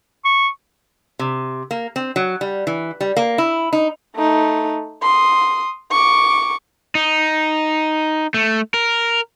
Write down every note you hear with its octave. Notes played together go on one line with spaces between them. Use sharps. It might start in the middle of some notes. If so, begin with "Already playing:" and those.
C#6
C3
A#3
C4
F#3
G3
E3
G3
A#3
E4
D#4
A3 D#4
C6 D#6
C#6 D6
D#4
A3
A#4